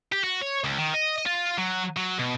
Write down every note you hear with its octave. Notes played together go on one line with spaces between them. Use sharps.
G4
F#4
C#5
C#2
D#3
D#5
F4
F#3
F#3
B2